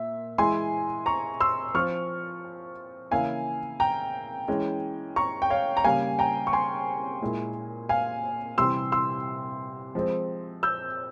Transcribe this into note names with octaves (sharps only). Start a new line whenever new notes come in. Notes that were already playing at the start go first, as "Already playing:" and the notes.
Already playing: A#2 E5
E3 G#3 E4 G#5 C6
A#5 C#6
C6 E6
F3 C4 F4 C#6 F6
C#3 E3 A#3 E4 F5 G#5
G5 A#5
E3 G#3 C#4
A#5 C#6
G5
C#5 F5
A#5
C#3 G3 A#3 F5 G#5
G5 A#5
C#6
G#5 C6
A#2 G#3 E4
F5 G#5
C3 E3 G3 C6 E6
C6 E6
F3 G#3 C4
E6 G6